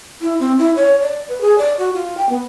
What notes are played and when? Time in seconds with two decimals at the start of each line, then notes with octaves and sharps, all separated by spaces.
0.21 E4
0.40 C4
0.58 E4
0.76 C#5
1.01 D5
1.28 B4
1.41 G#4
1.58 D5
1.78 F#4
1.94 F4
2.17 G5
2.29 B3